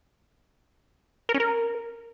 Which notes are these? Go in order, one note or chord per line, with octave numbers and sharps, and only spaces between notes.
A#4
C#4
A#4